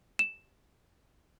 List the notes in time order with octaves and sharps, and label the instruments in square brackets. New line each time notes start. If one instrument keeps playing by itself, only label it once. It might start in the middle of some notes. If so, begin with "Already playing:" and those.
[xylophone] E7